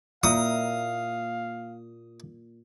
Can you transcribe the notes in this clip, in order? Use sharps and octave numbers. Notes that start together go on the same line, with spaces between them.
A#2 A#3 E4 A#4 F5 D#6